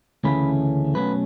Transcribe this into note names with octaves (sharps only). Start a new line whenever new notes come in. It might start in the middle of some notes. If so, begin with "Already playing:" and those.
D2 C#3 E3 A3 C#4 B5
B2 F#3 A3 C#4 B4